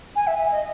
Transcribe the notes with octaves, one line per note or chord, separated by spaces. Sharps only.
G#5
E5
E5
D#5